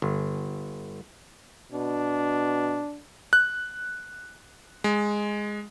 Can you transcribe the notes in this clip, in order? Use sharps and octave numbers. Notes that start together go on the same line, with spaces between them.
G1
B2 D4
F#6
G#3